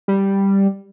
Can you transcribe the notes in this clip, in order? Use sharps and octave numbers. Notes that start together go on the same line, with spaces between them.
G3